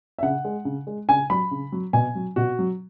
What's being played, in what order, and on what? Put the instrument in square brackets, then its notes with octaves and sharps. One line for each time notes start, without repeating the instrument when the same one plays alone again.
[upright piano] E5
C#3 F#5
G#3
C#3
G#3
C#3 G#5
F#3 B5
C#3
F#3
B2 G#5
F#3
B2 F#4
F#3